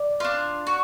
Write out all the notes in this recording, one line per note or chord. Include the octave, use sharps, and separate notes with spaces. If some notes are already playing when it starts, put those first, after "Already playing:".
Already playing: D5
D4 F4
F#4